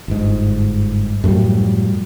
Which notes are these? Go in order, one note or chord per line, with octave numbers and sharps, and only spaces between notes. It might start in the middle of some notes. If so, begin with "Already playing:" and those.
G1 G#2
F#2 A2 F3 G3